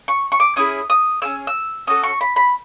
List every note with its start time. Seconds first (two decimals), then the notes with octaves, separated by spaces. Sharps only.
0.08 C#6
0.32 C#6
0.40 D6
0.56 C#4 E4 G#4 D#6
0.90 D#6
1.22 C#4 E4 G#4 E6
1.47 E6
1.87 C#4 F#4 A4 D#6
2.04 C#6
2.21 B5
2.36 B5